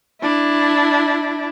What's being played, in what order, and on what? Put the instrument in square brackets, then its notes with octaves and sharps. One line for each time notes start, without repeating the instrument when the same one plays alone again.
[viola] D4 E4